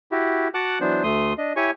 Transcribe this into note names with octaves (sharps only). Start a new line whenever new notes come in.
E4 F#4 G4
F#4 F#5 A5 D6 F#6
E3 F#3 B3 D4 C5
D2 A3 C6 D#6
D4 D#5
E4 G4 C#5 G#5 C#6